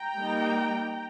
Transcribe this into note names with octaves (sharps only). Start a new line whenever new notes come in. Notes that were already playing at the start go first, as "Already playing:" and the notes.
Already playing: G5 A#5
G3 A#3 D#4